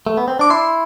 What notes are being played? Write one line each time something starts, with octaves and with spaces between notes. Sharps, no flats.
A3
B3
C4
D4 D6
E4 C6